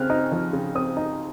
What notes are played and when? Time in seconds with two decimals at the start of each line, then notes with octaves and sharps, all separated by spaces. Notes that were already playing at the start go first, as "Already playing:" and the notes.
Already playing: C#3 C4 F6 F#6
0.10 D#4
0.32 F3
0.53 C#3
0.75 C4 D#6
0.97 D#4